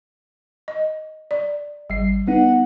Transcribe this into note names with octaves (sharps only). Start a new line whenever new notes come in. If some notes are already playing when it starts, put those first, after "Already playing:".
D#5
D5
G#1 G3 C7
B3 D#4 F#5